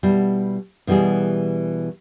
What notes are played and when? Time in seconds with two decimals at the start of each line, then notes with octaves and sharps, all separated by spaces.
0.03 B2 G3 E4
0.87 B2 E3 G3 G4 G#4